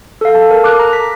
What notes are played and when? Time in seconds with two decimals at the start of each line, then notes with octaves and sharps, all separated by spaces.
0.21 A4 F5
0.35 A5
0.51 A#4
0.64 D6 F#6
0.79 A#5
0.93 B6